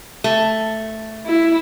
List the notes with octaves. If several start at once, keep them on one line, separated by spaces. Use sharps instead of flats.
A3
E4